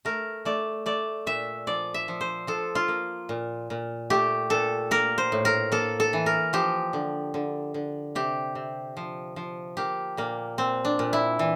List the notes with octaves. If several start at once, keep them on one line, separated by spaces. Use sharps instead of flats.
A3 A#4
A3 D5
A3 D5
A#2 E5
F3 D5
E5
F3
C5
F3 A4
F4
A#3
A#2
A#2
A3 G4
A#2 A4
A#3 A#4
C5
A2
A#4
A#3 A4
A4
E3
A#4
F3 G4
D3
D3
D3
C3 G4
C3
F3
F3
A#3 G4
A#2 A#3
A#2 C4
D4
A#2
E4
E3